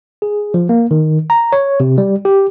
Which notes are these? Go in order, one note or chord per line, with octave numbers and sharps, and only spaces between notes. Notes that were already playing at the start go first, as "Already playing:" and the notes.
G#4
F3
A#3
D#3
A#5
C#5
C3
G3
G4